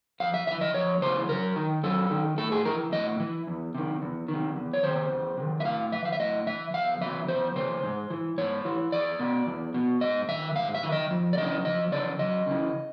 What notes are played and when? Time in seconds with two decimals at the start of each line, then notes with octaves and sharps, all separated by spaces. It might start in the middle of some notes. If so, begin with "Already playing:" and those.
0.20 F2 F5
0.34 E5
0.47 C#3 E5
0.51 E3
0.61 D#5
0.74 F2 C#5
1.02 C#3 E3 C5
1.29 F#2 A#4
1.56 D#3
1.83 F#2 A4
2.11 D#3
2.38 A2 A4
2.52 G#4
2.65 E3 A#4
2.92 A2 D#5
3.20 E3
3.47 E2
3.75 C3 D#3
4.02 E2
4.28 C3 D#3
4.56 E2
4.74 C#5
4.83 C3 D#3 C5
5.11 E2
5.38 C3 D#3
5.60 E5
5.65 A2 F5
5.92 E3 E5
6.05 F5
6.13 E5
6.20 A2 D#5
6.47 E3 E5
6.74 E2 F5
7.01 C3 E3 E5
7.28 E2 C5
7.56 C3 E3 C5
7.83 G#2
8.10 E3
8.38 G#2 C#5
8.65 E3
8.92 E2 D5
9.19 B2
9.47 E2
9.74 B2
10.01 G#2 D#5
10.28 D#3 E5
10.56 G#2 F5
10.75 E5
10.83 D#3
10.92 D#5
11.11 F2
11.33 D5
11.37 C#3 E3 D#5
11.65 F2 D#5
11.92 C#3 E3 D5
12.19 F#2 D#5
12.46 C#3 E3